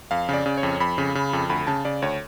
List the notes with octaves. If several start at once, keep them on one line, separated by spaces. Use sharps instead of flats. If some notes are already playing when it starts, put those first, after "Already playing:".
F2 F5
C#3 D5
C#3
C#5
F2
F2 B5
C#3
C#3
F2
D2 B5
C#3 A5
C#3 D5
D2 C#5